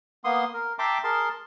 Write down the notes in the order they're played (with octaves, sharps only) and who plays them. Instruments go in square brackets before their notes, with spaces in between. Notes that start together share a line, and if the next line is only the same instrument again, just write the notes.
[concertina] A#3 B3 C6 D#6
A#4
E5 G5 A5 A#5 C6 D6
G#4 A#4 A5 C6